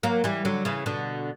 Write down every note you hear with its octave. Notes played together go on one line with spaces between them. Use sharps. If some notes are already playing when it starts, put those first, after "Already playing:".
F#3 A#3
E3 G3
D3 F#3
C#3 E3
B2 D3